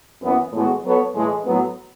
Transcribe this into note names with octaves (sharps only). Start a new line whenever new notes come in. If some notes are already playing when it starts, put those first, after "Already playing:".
F#2 E3 B3
A2 E3 G#3 B3 F#4
F#3 B3 F#4 A4 C#5
A2 E3 G#3
A2 F#3 B3